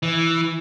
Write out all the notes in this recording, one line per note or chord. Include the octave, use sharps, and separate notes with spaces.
E3